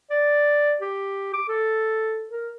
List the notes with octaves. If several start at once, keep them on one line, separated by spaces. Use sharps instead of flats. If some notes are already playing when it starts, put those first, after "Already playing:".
D5
G4
D6
A4
A#4